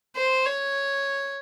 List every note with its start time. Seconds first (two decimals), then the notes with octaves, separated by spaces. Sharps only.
0.16 C5
0.46 C#5